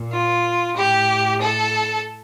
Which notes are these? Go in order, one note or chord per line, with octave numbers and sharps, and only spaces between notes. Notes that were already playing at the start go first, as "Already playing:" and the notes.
Already playing: A#2
F4
A2 G4
A4